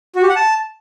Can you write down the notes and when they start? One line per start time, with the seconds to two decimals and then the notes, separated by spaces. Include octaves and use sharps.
0.16 F#4
0.22 G4
0.29 F#5
0.36 A5